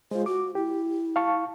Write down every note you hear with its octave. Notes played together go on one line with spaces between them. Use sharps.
G#3 F4 C5
F#4 D6
E4 G4
F5 A5 C#6